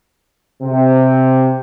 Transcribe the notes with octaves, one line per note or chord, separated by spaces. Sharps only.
C3